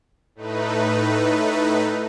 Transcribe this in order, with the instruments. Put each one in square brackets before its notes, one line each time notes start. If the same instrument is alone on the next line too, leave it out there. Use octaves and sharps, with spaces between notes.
[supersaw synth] A2 A3 D#4 B4